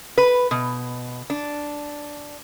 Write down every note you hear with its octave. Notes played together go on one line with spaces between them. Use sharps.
B4
B2
D4